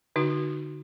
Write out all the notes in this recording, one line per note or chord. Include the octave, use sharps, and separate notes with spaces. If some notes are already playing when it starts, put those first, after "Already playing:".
D3 D#4 F#4